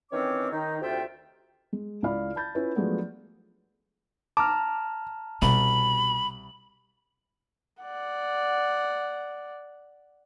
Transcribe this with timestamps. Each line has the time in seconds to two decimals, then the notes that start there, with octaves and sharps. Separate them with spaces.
0.12 D#3 E3 C4 C#4 C#5 D6
0.51 D#3 D#4
0.81 D2 C3 F4 E5 G5
1.73 G#3
2.03 C#2 E4 F4 D5 F5 B5
2.36 A5 B5 G6 A6
2.55 C#4 E4 F4 B4
2.75 F3 F#3 G#3 A3 B3 D4
4.37 A5 A#5 D6 F6
5.42 C2 B2 B5
7.82 D5 F#5